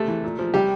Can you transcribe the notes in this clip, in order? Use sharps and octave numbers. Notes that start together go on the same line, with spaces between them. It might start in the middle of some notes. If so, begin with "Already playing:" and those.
Already playing: C3 A3 A4
E3
A#2
F3
C3 G3 G4